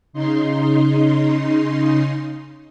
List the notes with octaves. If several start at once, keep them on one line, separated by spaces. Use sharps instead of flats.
C#3 D#4 C6